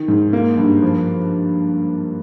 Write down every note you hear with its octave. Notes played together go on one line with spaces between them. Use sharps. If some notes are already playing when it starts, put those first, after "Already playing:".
Already playing: D#3
G#2
A#3
G2
F3